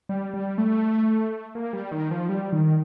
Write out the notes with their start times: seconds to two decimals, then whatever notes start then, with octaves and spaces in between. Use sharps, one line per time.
0.09 G3
0.34 G3
0.58 A3
1.55 A#3
1.73 G3
1.92 D#3
2.11 F3
2.29 G3
2.52 D#3